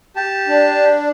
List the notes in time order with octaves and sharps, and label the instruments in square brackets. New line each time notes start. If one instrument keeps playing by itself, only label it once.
[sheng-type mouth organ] G4 A5
[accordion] D4